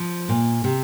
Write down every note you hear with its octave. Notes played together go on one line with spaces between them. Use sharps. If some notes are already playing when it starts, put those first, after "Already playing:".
Already playing: F3
A#2
C3